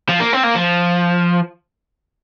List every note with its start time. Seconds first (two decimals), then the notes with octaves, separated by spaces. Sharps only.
0.09 F3
0.20 A#3
0.33 C4
0.43 A#3
0.55 F3